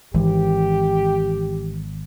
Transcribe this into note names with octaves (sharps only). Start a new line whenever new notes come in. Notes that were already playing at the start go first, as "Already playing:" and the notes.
G#1 E3 G4